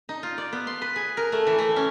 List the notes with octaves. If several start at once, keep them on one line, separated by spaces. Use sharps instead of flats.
D#4
F4
D5
B3
C6
B4
G#4
A#4
A3
E3
A3
C#4